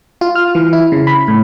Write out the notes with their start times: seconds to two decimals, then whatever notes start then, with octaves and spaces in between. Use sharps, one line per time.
0.21 F4
0.35 F6
0.55 E3
0.73 E4
0.92 C#3
1.07 B5
1.28 A2